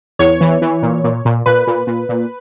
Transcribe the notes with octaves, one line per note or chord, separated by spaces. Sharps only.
E2 C#5
E3
E3
A#2
A#2
A#2
A#2 B4
A#2
A#2
A#2